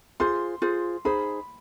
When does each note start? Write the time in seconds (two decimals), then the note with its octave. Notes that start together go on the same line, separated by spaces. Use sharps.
0.20 F4 G#4 C5 C6
0.62 F4 G#4 C5
1.05 D#4 G#4 C5 B5